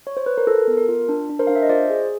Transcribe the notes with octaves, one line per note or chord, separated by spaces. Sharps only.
C#5
C5
B4
A#4
F4 A4
B3
A#4
F4
D4
D4
A#4 C5
D4 F5
E5
D#5
F4 C5 D5
G#4